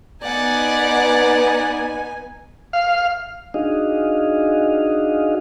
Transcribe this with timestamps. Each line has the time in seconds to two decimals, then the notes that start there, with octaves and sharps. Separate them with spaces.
0.23 B3 D#4 D5 F#5 G#5
2.73 F5
3.54 D4 D#4 F#4 G#4 D#5 F5